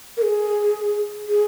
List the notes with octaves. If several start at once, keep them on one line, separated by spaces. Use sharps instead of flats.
A#4
G#4
G#4